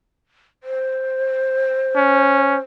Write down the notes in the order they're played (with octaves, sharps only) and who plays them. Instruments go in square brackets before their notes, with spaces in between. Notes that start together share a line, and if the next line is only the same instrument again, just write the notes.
[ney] C5
[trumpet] C#4